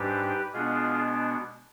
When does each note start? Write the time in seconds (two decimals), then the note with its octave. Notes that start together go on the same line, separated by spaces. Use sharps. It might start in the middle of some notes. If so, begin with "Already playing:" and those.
Already playing: G#2 G3 D4 G4 B4
0.53 B2 G#3 B3 D4 F4 G#4